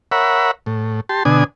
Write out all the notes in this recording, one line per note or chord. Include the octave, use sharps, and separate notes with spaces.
A#4 C#5 E5 F#5 B5
A2
G4 A5 C6
B2 D3 D4 G#5 D#6